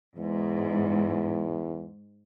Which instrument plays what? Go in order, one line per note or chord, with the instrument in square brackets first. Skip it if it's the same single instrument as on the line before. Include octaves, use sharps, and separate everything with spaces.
[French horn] E2 [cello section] G#2